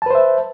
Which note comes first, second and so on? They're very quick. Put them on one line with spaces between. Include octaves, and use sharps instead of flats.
A5 B4 C5 E5